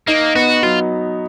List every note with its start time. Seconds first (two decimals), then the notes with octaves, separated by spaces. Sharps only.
0.07 A#3 D#4
0.35 B3 F#4
0.63 F#3 F4